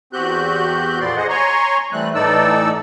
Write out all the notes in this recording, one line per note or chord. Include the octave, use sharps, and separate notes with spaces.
E2 C4 F#4 G4 F#6 G6
F2 A#2 B3 D5 C6
G#4 C5 D#5 F#5
C#5 G#5 A#5 C6 C#6
E3 G3 A3 C4 F#6
A2 E3 D#4 A4 D5 E6